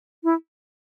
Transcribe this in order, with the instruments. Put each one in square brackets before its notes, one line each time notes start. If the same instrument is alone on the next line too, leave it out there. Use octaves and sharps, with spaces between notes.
[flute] E4